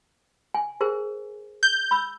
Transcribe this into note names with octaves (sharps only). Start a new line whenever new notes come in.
G#5
G#4 A#4 C5
G6
B5 E6